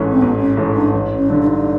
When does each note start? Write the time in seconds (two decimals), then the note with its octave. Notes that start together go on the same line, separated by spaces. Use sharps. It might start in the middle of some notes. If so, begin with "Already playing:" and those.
Already playing: A1 G#2 E3 A3 C#4
0.11 C4
0.21 A1 B3
0.39 C#4
0.57 G#2 E3 A3 C#4
0.75 D4
0.93 A1
1.17 C#4
1.29 G2 D3 D4
1.41 D4
1.47 D#4